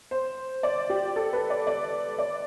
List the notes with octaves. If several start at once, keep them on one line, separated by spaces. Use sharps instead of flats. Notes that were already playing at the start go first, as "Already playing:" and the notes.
C5
D5
G4
A4
B4
D5
D5
D5